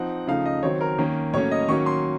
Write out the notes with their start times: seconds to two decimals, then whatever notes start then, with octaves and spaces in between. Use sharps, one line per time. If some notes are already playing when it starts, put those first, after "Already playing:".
Already playing: F3 C4 D#4 F#5
0.27 C#3 F3 A3 D#4 F5
0.46 D#5
0.63 D#3 F#3 C4 C#5
0.81 A#4
0.98 D#3 A#3 C#4
1.33 A2 F#3 A#3 C#4 C#5
1.51 D#5
1.68 D#3 F#3 A#3 C#4 C#6
1.86 C6